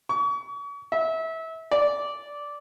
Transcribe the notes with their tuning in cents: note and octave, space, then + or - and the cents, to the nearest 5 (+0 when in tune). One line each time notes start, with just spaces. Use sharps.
C#6 +40
E5 -25
D5 -10